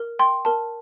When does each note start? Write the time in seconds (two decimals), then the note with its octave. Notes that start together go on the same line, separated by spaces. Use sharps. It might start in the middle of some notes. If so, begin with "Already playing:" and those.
Already playing: A#4
0.19 G5 C6
0.45 A#4 A5